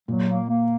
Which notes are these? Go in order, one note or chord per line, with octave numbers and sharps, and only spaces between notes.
A#2 F#3
A#3
A#3